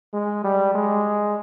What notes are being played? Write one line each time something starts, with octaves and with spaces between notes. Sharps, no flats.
G#3
G3
G#3